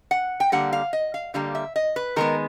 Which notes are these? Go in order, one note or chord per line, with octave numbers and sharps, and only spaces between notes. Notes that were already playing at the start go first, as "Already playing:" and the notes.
F#5
G5
D3 G3 A#3 F#5
F5
D#5
F5
D3 G3 A#3 F5
E5
D#5
B4
D#3 G#3 B3 A#4